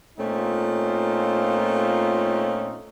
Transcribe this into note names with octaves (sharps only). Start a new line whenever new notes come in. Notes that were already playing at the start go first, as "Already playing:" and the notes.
A#2 A3 C4 C#4 D#4 F4